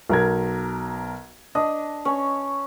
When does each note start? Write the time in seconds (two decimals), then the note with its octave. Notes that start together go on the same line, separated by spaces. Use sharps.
0.10 B1 A#4 G#6
1.55 D4 D#5 D#6
2.05 C#4